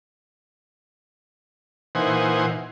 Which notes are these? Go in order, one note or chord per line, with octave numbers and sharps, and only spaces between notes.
A#2 E3 D#4 C5 F#5 G#5